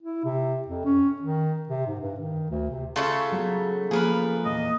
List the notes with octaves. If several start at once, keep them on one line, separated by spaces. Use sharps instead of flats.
E4
C3
F2
C#4
D#3
C3
G#2
G2
D#3
D2
C3
C#3 A3 F4 A4 E5 C#6
F#3 B3
F3 A#3 G#4 A#4 B4
E2 A#2 A#3 D#5